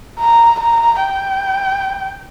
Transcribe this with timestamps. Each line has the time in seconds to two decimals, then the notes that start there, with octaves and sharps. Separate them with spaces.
0.19 A#5
0.59 A#5
1.00 G5